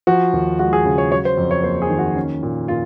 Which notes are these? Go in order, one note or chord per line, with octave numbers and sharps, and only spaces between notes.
F3 F#4
D#2
G#3 F#4
G#4
C#3
C#5
F#3 C#5
C5
F2
C#5
A#3 C5
G#4
D#3
F#4
C#4
A#2
A#2 F4